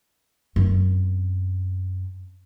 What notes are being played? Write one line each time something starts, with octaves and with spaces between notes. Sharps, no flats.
F#2 C4